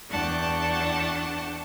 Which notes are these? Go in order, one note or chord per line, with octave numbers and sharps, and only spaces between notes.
E2 D4 F#5 G5 A5 C#6